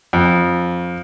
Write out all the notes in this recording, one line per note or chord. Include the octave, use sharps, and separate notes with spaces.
F2